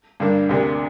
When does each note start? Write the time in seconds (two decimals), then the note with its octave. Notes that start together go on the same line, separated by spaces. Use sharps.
0.20 G2 D3 A#3 D4
0.49 D2 C3 A#3 D4